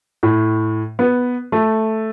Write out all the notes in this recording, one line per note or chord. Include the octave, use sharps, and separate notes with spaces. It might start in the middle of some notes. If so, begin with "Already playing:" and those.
A2
B3
A3